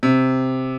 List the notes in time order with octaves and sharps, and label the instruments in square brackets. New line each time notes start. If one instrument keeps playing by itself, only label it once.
[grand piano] C3